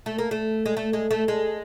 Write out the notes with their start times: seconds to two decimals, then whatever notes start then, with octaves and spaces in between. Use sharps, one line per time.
0.06 A3
0.18 A#3
0.31 A3
0.66 G#3
0.77 A3
0.93 G#3
1.11 A3
1.28 G#3